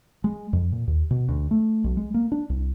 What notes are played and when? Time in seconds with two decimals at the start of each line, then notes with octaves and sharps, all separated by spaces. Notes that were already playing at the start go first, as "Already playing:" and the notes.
0.24 G#3
0.53 F2
0.72 A#2
0.87 D#2
1.11 B2
1.29 D2
1.51 A3
1.84 B1
1.97 G#3
2.14 A#3
2.32 D4
2.50 C2